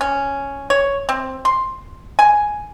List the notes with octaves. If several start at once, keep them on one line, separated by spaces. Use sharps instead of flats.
C#4
C#5
C4
C6
G#5